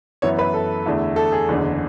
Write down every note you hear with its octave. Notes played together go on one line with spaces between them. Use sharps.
F#2 E3 B3 E4 C#5
B4
A4
E2 D3 A3 E4
A4
G#4
F#1 E2 D3